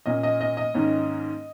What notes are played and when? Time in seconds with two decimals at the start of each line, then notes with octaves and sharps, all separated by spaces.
0.06 A#2 A#3 C#4 D#5
0.23 D#5
0.41 D#5
0.57 D#5
0.74 G#2 D#3 A#3 C#4